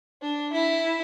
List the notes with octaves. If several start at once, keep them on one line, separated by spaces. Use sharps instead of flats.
D4
E4